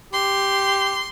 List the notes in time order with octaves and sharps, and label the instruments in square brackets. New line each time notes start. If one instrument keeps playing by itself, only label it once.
[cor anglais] G4 [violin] C6